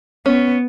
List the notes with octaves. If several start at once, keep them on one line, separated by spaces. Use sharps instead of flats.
B3 C#4